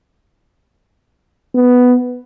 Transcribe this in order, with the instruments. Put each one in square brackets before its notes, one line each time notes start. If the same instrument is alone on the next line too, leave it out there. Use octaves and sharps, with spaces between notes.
[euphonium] B3